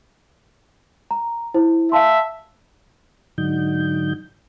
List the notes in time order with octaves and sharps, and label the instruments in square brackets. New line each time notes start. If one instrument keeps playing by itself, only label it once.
[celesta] A#5
E4 C5
[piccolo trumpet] E5 [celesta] F5 A5 C6
[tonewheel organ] G#2 D3 F#3 D#4 G6